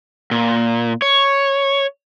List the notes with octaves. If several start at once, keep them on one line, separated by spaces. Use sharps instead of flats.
A#2
C#5